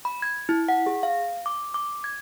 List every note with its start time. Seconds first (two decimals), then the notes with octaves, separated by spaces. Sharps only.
0.05 B5
0.22 G#6
0.49 E4
0.69 F#5
0.86 G#4
1.03 F5
1.46 D6
1.74 D6
2.04 G#6